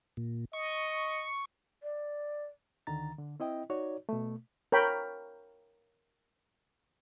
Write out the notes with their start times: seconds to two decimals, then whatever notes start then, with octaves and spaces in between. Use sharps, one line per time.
0.17 A#2
0.53 D#5 C#6
1.83 D5
2.87 D2 D3 D#3 A#5 A6
3.19 D3
3.40 C4 E4 D#5 G5
3.70 D#4 F#4 C#5 D5
4.09 B2 A3
4.72 A#4 C#5 G5 B5